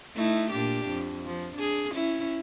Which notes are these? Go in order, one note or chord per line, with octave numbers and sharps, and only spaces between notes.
A3 D#4 E4
A#2 D4 G4
F2
F3
D4 G#4
C#4 E4